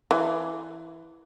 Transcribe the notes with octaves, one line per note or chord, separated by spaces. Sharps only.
E3